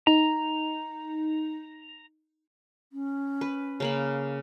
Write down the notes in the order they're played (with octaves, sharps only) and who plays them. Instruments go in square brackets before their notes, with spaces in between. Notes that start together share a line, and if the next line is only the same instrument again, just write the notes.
[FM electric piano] D#4 [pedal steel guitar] A#5
[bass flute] C#4
[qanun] B4
C#3 A#3 B5